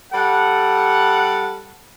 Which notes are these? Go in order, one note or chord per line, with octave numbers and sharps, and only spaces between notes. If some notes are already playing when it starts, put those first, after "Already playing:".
G3 A4 F#5